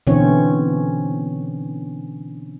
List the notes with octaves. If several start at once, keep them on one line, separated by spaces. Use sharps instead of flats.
B2 D3 E3 C4 C#4 C#5